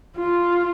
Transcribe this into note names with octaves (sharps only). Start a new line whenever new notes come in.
F4